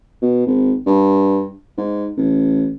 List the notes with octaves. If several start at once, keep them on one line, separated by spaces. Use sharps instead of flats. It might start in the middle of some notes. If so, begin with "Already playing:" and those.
B2
G#1
G2
G#2
A1